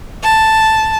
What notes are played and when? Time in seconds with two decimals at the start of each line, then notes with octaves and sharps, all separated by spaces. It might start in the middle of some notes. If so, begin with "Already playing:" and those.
0.24 A5